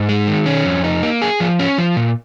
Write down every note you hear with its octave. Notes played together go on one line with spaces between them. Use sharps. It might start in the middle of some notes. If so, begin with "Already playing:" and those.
Already playing: G#2
G#3
D#3
C#4
F2
D#4
A#3
G#4
F3
C#4
F3
A#2